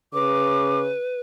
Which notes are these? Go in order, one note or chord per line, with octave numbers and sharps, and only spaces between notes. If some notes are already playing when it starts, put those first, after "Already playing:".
C#3 B4 D6